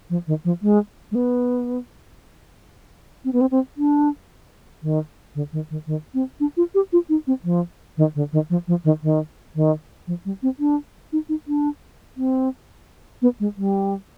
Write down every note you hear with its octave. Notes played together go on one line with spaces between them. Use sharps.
F3
D#3
F3
G#3
G#3
B3
C4
B3
C4
C4
D4
D#3
D3
D#3
D#3
D#3
C4
D4
F4
G4
F4
D#4
C4
F3
D#3
D3
D#3
F3
F3
D#3
D#3
D#3
F3
G3
C4
D4
D#4
D#4
D4
C4
B3
G#3
G3